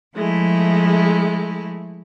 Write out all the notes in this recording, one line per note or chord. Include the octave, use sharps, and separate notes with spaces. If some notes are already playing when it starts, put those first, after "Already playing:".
F3 G#3 A3 E4